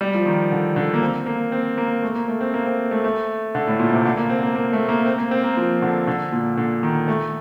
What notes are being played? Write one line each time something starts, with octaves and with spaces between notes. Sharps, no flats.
G3
F3
D#3
D3
D3
A#3
C4
A#3
C4
A#3
A3
A#3
A3
C4
A#3
C4
A3
A3
D3
A2
A#2
C3
D3
A#3
C4
A#3
A#3
A3
A#3
C4
A#3
C4
A#3
F3
D3
D3
A#2
D3
D#3
A3